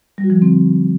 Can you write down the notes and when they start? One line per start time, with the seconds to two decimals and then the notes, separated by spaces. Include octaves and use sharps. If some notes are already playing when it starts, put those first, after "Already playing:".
0.18 G3
0.24 F#4
0.30 F3
0.36 D3
0.42 C4